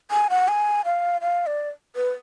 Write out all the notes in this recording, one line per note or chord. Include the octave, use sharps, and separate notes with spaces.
G#5
F#5
G#5
F5
F5
D5
B4